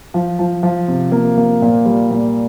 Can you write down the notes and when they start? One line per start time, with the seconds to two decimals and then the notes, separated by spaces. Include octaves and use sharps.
0.14 F3
0.39 F3
0.63 F3
0.88 C3
1.12 A#3
1.38 A#3
1.62 A#2
1.86 G3
2.11 A#2